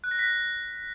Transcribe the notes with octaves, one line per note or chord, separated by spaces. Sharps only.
F#6
A#6
B6